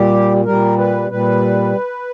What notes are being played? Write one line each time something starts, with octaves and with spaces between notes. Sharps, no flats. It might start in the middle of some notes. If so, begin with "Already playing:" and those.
Already playing: A#2 G3 G4
A#2 G3 A#4
B4
A#2 G3 B4